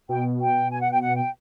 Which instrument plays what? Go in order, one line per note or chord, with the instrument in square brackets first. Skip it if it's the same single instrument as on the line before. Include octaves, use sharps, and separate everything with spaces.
[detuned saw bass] B2 [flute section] G5
[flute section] G5
G#5
F#5
G5
F#5
G5